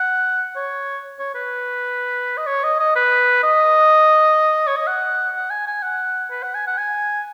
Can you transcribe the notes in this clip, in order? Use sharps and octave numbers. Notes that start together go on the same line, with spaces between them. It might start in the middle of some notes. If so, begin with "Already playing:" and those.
Already playing: F#5
C#5
C#5
B4
D#5
C#5
D#5
D#5
B4
D#5
C#5
D#5
F#5
F#5
G#5
G#5
F#5
B4
F#5
G#5
F#5
G#5